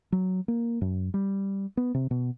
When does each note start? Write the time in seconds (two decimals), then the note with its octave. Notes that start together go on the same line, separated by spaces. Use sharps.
0.12 F#3
0.48 A#3
0.81 F#2
1.14 G3
1.77 B3
1.94 C3
2.11 B2